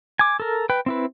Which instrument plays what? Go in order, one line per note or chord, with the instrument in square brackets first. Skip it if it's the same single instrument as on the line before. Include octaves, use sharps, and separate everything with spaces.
[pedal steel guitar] G#5 D6
A4 A#4
B4 G5
C4 E4 B4